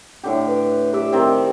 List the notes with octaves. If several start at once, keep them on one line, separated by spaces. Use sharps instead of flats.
A2 D3 G4
B4
G4 D5 E5
D#3 C4 G4